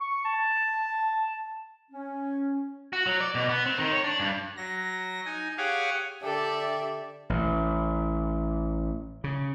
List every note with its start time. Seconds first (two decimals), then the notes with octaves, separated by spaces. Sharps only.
0.01 C#6
0.25 A5
1.91 C#4
2.93 F#4
3.07 F#3
3.21 D5
3.35 B2
3.49 B3
3.66 C4
3.78 D#3
3.92 C#5
4.04 D4
4.20 G2
4.57 F#3 A#6
5.25 D#4 G#5
5.58 G4 G#4 C#5 F5 F#5 G#5
6.23 D3 G4 A4 D5 E5
7.30 A1
9.24 C#3